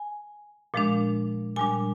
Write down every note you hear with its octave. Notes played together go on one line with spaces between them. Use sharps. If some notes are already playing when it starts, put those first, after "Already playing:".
Already playing: G#5
A#2 F3 G#3 D4
A#2 G3 D4 G#5